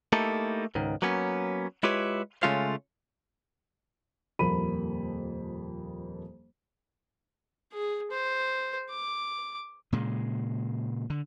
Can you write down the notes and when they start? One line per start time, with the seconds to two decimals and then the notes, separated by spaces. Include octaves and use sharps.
0.13 A3 A#3 D#4 E4 G4 A4
0.75 C#2 G#2 D#3
1.02 F#3 A#3 B3 C#4
1.83 G#3 E4 F4 G4 B4 C#5
2.43 C#3 G#3 A3 C#4 F4 F5
4.39 D#1 F2 A#3 B5 D#7
7.73 G#4
8.11 C5
8.90 D6
9.92 A#2 C#3 G#3
11.10 D3